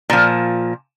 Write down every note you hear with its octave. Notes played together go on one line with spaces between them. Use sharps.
A#2 F3